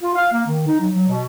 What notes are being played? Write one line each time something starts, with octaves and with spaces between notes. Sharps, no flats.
F4
F5
A#3
D#3
D#4
F#3
F#3
B2